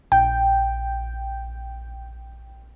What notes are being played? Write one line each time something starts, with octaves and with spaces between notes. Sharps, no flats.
A#1 G5